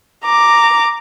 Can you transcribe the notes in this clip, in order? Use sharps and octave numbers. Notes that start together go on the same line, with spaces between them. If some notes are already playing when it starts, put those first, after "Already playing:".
A#5 D6